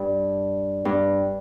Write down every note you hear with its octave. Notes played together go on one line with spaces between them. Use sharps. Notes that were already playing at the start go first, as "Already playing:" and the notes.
Already playing: G2
G2